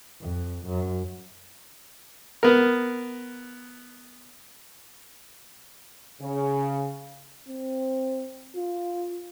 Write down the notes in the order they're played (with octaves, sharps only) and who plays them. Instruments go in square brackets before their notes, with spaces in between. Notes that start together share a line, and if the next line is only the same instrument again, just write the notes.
[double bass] F2
F#2
[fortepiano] B3 A#4
[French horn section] C#3
[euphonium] C4
F4